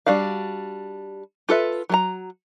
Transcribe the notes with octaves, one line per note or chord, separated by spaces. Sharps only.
G3 D4 F#4 F5
F4 A4 B4 E5
F#3 G#4 A#5